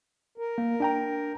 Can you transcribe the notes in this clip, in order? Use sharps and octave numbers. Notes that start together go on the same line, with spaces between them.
A#4
A#3
D4 G5 A#5